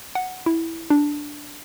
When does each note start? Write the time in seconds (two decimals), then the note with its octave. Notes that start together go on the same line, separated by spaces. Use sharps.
0.15 F#5
0.46 E4
0.90 D4